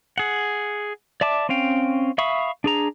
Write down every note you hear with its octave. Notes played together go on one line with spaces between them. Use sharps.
G#4 F#5
D5 E5 A5 D6
C4 C#4 F5 G5
E5 F5 B5 C#6 D#6
D4 G#4 A#5